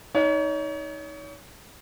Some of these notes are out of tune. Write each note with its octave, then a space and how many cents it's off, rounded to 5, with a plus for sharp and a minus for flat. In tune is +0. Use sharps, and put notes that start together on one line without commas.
D#4 +15 C#5 +35